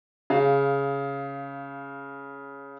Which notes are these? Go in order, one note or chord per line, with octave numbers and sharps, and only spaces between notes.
C#3 F5